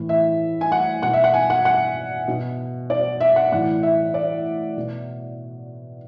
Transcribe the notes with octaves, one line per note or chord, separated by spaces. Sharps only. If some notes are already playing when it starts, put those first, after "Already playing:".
Already playing: A2 E3
E5
G#5
F#5
B2 F#5
E5
F#5
G#5
F#5
F#5
B2
D5
E5
F#5
A2 E3 F#5
E5
D5
B2